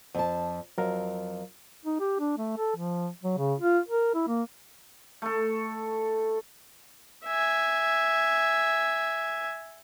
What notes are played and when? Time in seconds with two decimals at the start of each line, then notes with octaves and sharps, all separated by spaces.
0.14 F2 A5
0.78 F2 F#3 A#4 F5
1.85 D#4
2.00 G4
2.20 D4
2.38 A3
2.57 A4
2.76 F3
3.23 F#3
3.38 C#3
3.60 F4
3.88 A#4
4.14 E4
4.27 A#3
5.22 A3 A4
7.25 E5 G#5